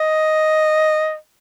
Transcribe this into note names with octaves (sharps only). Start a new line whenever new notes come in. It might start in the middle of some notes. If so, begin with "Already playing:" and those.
Already playing: D#5